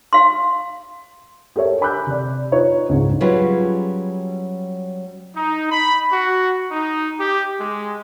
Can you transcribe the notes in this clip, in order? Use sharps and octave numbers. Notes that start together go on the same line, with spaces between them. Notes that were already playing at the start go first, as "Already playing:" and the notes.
F5 C6
G4 A4 A#4 C#5 E5
G#5 B5 D6 E6 F#6 G6
C3 D5
D#4 F4 B4 C#5 D#5
C#2 G#2
F#3 G3 C#4 F4 G#4 B4
D#4
B5
F#4
D#4
G4
G#3